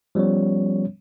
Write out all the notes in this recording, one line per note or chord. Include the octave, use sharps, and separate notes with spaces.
F3 G3 B3 C#4 C#5